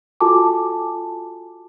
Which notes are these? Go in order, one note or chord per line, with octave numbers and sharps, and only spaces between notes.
F4 F#4 A4 G#5 A5 D6